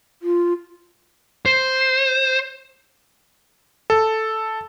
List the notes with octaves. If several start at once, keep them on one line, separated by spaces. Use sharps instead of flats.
F4
C5
A4